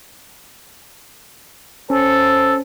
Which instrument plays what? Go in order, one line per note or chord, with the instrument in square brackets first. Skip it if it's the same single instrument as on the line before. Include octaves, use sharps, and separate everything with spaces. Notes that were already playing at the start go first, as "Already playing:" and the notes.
[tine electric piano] C#4 [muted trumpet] A4 [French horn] C5